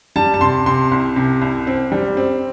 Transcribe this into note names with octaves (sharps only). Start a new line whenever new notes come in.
G3 A5
A5
C3 C6
C3 C6
C2
C3
C2
C4
G3
C4